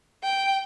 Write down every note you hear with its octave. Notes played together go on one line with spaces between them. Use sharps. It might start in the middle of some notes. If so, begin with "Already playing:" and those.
G5